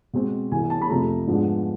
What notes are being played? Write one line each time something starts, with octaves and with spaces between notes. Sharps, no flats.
B2 G#3 C4
C2 C3 E3 G#5
A5
B5
F2 C3 F3 A3 A#5
G#2 F3 G#3 B3 D4